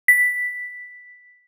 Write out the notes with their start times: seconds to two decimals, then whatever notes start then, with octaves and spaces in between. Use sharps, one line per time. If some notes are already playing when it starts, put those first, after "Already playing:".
0.08 B6